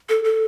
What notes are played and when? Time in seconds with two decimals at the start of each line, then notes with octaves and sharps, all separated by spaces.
0.09 A4
0.24 A4